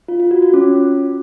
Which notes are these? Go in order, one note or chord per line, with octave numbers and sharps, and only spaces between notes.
F4
F4
F#4
F#4
C#4